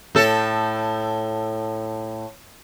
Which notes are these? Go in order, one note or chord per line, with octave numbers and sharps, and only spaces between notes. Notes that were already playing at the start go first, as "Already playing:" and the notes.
A2 A4